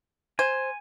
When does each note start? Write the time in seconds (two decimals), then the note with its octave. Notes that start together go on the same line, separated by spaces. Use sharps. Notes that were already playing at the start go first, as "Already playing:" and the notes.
0.39 C5 G#5